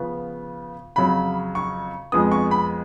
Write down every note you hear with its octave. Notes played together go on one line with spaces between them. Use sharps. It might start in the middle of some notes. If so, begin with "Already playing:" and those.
Already playing: C#3 F3 B3
F2 C#3 F#3 B5
C#6
F2 F3 G#3 B3 D#6
C#6
B5